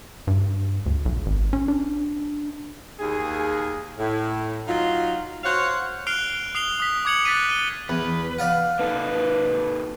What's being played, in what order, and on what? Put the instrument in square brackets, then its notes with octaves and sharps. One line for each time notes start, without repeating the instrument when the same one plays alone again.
[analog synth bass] G2
D2
B1
G#1
C#4
D4
[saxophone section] D#2 G#4
A2
F#3 D#4 F4
F#4 C5 C#5 F5 F#5
[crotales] F6 F#6 C7 D7 F7 G7
D#6 C7 F7 G7
D#6 B6
D6 D#6 G#6 C#7 F7 F#7
F#6 A6 B6 D#7
D#7 G7
[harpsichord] E2 [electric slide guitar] B4
[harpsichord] D5 F5 F#5
[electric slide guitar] A#3 D#4 A4 [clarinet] B4